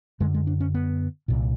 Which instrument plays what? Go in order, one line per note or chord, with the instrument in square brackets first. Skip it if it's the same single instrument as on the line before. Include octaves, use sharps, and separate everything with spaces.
[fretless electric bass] F#2 D3 G#3
G#3
D4
C#4
B3
C2 A#2